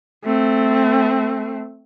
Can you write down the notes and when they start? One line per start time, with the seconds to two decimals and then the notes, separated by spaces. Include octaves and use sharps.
0.25 A3 C4